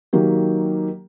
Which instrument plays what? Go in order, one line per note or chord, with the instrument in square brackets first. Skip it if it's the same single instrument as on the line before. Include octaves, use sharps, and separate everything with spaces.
[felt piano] D#3 F#3 A#3 G4